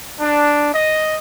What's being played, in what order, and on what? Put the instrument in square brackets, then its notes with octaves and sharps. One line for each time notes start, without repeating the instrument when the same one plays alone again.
[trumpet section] D4
D#5